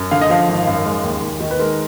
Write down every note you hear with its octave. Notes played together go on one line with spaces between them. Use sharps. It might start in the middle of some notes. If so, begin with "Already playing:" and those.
Already playing: F#2
D3 F5
D#5
F3 F5
G#1
F#2
G#3
D#2
D#2
D#3
B4
G#3 A#4